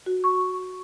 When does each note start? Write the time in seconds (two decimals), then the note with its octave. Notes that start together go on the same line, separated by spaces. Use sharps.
0.06 F#4
0.24 C#6